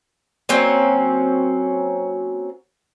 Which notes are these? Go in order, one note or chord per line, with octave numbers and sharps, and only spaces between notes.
F#3 A#3 C4 C#4